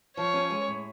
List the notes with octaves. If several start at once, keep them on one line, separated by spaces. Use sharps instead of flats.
F3 C#5
C#4
G#3
A2